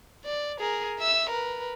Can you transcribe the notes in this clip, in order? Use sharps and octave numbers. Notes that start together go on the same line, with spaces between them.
D5
G#4 A#4
E5 E6
A#4 B4